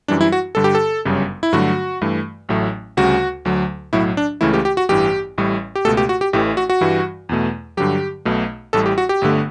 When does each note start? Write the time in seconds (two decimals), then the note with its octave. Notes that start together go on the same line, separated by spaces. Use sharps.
0.08 F#2 E3 G3 D4
0.21 E4
0.32 F#4
0.55 G2 D3 G3 A4
0.64 G4
0.75 A4
1.05 G1 F#2 C#3 G3
1.43 E4
1.53 G2 D3 F#3 A3 F#4
2.01 G2 E3 A3
2.49 A1 A2 F#3 A3
2.97 D2 C#3 G3 F#4
3.45 D2 D3 F#3
3.93 B1 A2 F#3 E4
4.17 D4
4.41 C#2 C#3 E3 A3 E4
4.54 G4
4.65 G4
4.77 F#4
4.89 A1 G2 E3 G4
5.38 A1 A2 G3
5.76 G4
5.85 C#2 B2 A3 A4
5.97 G4
6.09 F#4
6.21 G4
6.33 A1 A2 E3 A3 G4
6.57 F#4
6.70 F#4
6.81 G2 E3 G3
7.29 E2 B2 A3
7.77 G2 D3 F#3 G4
8.25 B1 B2 A3
8.73 A1 A2 G3 A4
8.86 G4
8.98 F#4
9.09 G4
9.22 G1 G2 D3 A3